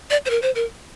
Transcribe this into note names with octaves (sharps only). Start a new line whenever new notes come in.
D5
C5
A#4
C5
A#4